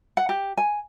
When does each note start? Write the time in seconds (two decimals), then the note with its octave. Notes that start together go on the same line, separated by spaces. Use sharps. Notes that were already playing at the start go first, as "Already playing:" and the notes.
0.17 F#5
0.29 G4
0.57 G#5